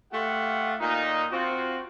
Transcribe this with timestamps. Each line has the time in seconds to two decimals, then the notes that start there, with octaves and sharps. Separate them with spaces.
0.13 A3 F4 G4 F#5
0.80 A#2 D#4
1.31 C4 F4 F#4